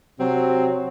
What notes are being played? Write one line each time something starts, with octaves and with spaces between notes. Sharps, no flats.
C3 F#3 C4